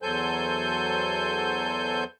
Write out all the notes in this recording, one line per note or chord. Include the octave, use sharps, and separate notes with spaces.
E2 F#3 A4 C5 G#5 G6